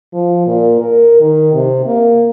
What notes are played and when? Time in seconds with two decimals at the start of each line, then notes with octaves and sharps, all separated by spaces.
0.13 F3
0.47 A#2
0.80 A#4
1.21 D#3
1.54 C3
1.86 A#3